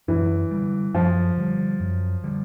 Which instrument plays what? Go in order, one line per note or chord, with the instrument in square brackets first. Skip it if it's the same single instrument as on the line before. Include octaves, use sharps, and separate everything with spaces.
[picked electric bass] F#2 [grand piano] E3
[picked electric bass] D3 G3
[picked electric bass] F#2 [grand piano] F3
[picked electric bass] D3 G3
F#2
D3 G3